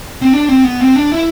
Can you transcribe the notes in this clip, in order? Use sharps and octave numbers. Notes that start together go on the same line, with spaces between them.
C4
D4
C4
B3
C4
D4
E4